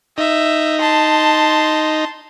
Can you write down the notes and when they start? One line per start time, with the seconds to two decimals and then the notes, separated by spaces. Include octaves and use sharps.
0.18 D#4 E5
0.80 A5 C6